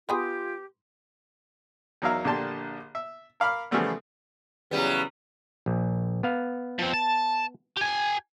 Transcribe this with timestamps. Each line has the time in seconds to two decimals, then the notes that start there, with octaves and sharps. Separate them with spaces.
0.09 B3 F4 G4 G#4 B5 C6 D#6
2.02 E2 F#3 D#4 A#4 E5 F5
2.24 A#1 D3 A#3 G4 A5 C6
2.95 E5
3.40 A#4 F5 B5 D6 F6
3.71 C#3 E3 F3 G3 A3 B3
4.71 E2 C#3 F#3 G3 B3
5.66 A#1
6.23 B3 F5
6.79 F3 C4
6.94 A5
7.77 G4 G#5